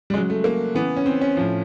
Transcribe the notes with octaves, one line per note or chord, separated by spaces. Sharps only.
G3
C#3 F#3 G#3
A3
A#3
C#3 E3 B3
C#4
C4
C#4
A2 F3